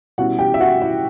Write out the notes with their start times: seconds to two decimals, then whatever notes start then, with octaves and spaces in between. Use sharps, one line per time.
0.18 B2 G3 C#4 E4 F#4 F#5
0.39 G4 G5
0.54 E5
0.60 F#4 F#5
0.82 E4 E5